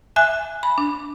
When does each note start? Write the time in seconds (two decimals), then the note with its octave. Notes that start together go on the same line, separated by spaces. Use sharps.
0.16 E5 G#5 F#6
0.63 B5
0.78 D4